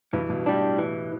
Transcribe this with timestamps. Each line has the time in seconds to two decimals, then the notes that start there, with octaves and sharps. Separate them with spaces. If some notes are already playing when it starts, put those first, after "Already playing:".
0.13 G2 B2 E3
0.30 G2 B2
0.46 A2 G3 D4
0.62 A2
0.78 A2 E3